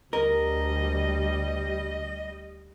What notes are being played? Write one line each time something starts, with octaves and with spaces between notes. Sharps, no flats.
D2 G3 A#4 D#5